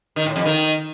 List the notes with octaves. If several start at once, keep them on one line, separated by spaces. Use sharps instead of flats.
D#3
A2
F2
D#3